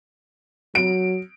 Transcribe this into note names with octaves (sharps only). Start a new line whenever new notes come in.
F#3 D7